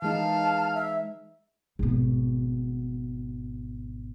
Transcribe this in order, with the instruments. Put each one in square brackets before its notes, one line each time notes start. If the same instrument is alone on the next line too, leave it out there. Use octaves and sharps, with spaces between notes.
[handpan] E3 G#3 D#4 [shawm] F5 [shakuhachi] A5
[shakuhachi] E5
[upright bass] G#1 B2